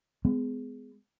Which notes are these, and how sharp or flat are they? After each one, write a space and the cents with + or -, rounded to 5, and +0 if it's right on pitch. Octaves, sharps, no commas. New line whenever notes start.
G#3 +0 B3 +30